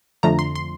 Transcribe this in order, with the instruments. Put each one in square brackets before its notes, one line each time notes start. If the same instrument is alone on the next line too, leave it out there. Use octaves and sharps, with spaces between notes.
[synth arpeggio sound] F2 D3 F3 A3 A#5
C6
C6